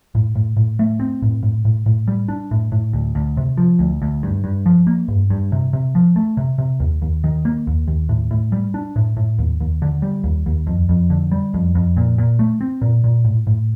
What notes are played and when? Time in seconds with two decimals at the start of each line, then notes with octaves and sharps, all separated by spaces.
0.15 A2
0.35 A2
0.57 A2
0.79 A3
1.00 C4
1.22 A2
1.43 A2
1.65 A2
1.86 A2
2.08 G3
2.29 D4
2.51 A2
2.72 A2
2.93 D2
3.15 D2
3.37 C3
3.57 F3
3.79 D2
4.02 D2
4.23 G2
4.44 G2
4.66 F3
4.87 A#3
5.08 G2
5.30 G2
5.52 C3
5.73 C3
5.95 F3
6.16 A3
6.37 C3
6.58 C3
6.80 D#2
7.02 D#2
7.24 D#3
7.45 A#3
7.67 D#2
7.88 D#2
8.09 A2
8.31 A2
8.52 G3
8.74 D4
8.96 A2
9.17 A2
9.38 D#2
9.60 D#2
9.82 D3
10.02 G3
10.24 D#2
10.46 D#2
10.67 F2
10.89 F2
11.10 D3
11.31 G3
11.54 F2
11.75 F2
11.97 A#2
12.18 A#2
12.39 A3
12.61 C4
12.82 A#2
13.04 A#2
13.25 A2
13.47 A2